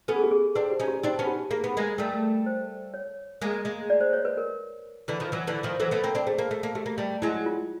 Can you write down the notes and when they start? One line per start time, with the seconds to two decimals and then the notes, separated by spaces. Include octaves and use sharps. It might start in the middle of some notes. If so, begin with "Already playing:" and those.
0.08 B3 C#4 A4
0.16 G#4
0.24 G4
0.31 G#4
0.55 C4 D4 B4
0.71 G4
0.80 C#4 D#4
0.88 G4
1.03 C4 D4 D#4
1.19 B3 C#4
1.27 G4
1.51 A#3 G#4
1.64 B3
1.77 G#3 A#3
1.98 G3 A3 A#4
2.46 C5
2.94 C#5
3.42 G#3 A#3
3.65 G#3 A#3
3.90 D5
4.01 C5
4.13 C#5
4.25 B4
4.37 A#4
5.08 D3 E3
5.20 D#3 F3
5.32 E3 F#3
5.47 D3 E3
5.63 D#3 F3
5.80 E3 F#3 A4
5.91 A3 B3
6.04 A#3 C4
6.15 C4 D4
6.27 A3 G#4
6.38 A#3
6.51 A3
6.63 A#3
6.75 A3 G4
6.86 A#3
6.98 G3 A3
7.22 F#3 G#3 E4
7.46 F4